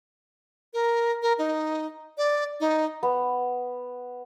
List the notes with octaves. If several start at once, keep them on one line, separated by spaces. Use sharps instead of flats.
A#4
A#4
D#4
D5
D#4
B3